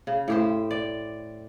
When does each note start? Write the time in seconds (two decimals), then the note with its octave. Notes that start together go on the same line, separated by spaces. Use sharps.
0.07 C#3
0.28 A2 G4 C5
0.71 D5